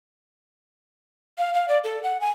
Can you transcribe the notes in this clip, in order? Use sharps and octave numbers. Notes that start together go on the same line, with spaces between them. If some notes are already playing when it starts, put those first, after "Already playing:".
F5
F5
D5
A4
F#5
G#5